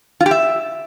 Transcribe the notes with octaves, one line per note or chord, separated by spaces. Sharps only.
F4
G4
E5